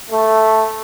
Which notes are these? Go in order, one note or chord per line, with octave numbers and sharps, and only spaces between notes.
A3